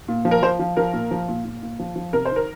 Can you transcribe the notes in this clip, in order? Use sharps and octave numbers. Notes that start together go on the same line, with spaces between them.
A#2
F3
A#4
F3 C5
F3
F3 A#4
A#2
F3
A#2
A#2
A#2
F3
F3
C3 A#4
C5
D#3
A#4